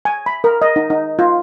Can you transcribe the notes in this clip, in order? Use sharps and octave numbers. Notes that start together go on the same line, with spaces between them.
G#5
B5
A#4
D#5
D#4
D#4
F4